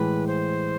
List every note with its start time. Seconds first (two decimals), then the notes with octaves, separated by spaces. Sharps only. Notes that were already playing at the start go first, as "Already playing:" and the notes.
Already playing: A2 E3 G#3 B4
0.27 C5